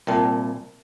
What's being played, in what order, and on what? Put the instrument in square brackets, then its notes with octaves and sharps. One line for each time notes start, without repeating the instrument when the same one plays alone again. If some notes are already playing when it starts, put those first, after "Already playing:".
[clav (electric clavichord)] C2 A#2 [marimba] A#4 G5 A5